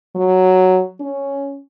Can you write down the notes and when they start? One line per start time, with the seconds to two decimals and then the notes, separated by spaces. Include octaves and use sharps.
0.16 F#3
1.00 C#4